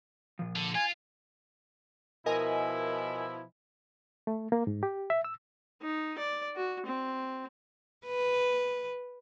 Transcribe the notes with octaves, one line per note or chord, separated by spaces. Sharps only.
A#2 F3
D3
F4 G#5
B2 F3 E4 A#4 D#5 G#5
A3
A#3
G#2
G4
E5
E6
D#4
D5
F#4
C4
B4